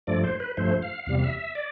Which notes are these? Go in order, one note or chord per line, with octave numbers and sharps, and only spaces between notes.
G2 F3 A3 D5
C5
B4
G2 F3 A3 C5
F5
E2 C3 G3 F5
F5
E5
E5
D5